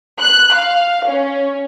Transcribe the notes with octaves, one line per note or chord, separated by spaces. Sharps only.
F#6
F5
C#4